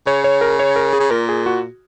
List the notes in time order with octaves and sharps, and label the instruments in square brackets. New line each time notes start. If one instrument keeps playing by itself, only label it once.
[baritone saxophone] C#3 [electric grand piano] C#5
[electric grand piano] C#5
A#4
C#5
A#4
G#4
[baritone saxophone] C#3
[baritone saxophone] A#2 [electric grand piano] A#4
[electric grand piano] G#4
F#4